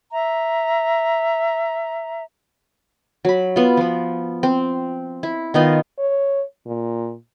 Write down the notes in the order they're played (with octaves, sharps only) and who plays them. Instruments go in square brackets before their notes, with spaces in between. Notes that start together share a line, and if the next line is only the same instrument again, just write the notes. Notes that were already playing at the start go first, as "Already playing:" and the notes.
[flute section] E5 A#5
[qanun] F#3 B5
B3 F4
F3 B3
C4
E4
D#3 B3 D#4 F4
[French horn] C#5
A#2